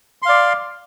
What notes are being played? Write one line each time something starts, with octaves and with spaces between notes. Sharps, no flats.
D5 F5 C6